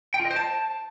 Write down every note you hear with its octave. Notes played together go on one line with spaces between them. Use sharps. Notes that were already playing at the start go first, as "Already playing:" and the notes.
G5
F4
D#5
C5
A5